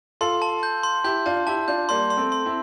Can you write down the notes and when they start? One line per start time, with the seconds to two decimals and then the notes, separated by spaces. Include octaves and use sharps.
0.21 F4 A4 C6
0.42 A5
0.63 G6
0.83 C6
1.04 E4 G4 G6
1.26 D4 F4 A5
1.47 E4 G4 A5
1.68 D4 F4 G6
1.89 G3 A#3 C6
2.10 C6
2.17 A3 C4
2.32 C6
2.46 C4 E4